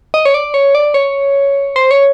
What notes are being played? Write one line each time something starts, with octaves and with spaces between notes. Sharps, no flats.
D#5
C#5
D5
C#5
D5
C#5
C5
C#5